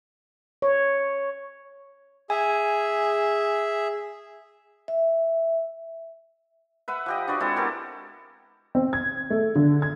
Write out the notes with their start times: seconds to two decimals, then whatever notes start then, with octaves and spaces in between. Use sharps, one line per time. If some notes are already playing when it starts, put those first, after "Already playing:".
0.62 C#5
2.30 G#4 E5 G#5
4.88 E5
6.88 B4 E5 F#5
7.06 F3 G4 D#5
7.28 D4 F#4 B4 D#5
7.40 G#3 C4 E4 A4
7.56 B3 G4 A4 A#4
8.75 C4
8.93 G#6
9.30 A3
9.56 D3
9.82 G#6